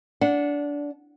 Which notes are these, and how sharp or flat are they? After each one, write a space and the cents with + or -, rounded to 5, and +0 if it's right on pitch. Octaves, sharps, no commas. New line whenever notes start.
D4 -20 F#5 -10